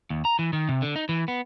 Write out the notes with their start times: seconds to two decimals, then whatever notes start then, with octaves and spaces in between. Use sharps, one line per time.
0.10 D#2
0.25 A#5
0.39 E3
0.53 D#3
0.69 C3
0.82 D3
0.96 D#4
1.09 E3
1.28 B3